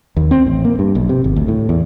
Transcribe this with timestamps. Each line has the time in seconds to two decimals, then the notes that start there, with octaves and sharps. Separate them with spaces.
0.17 D#2
0.31 C4
0.46 A1
0.65 A#3
0.79 G2
0.95 B1
1.09 C3
1.24 G#1
1.36 D2
1.48 A2
1.69 E2